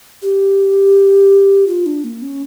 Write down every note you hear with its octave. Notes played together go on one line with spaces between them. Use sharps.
G4
F4
D4
A#3
C#4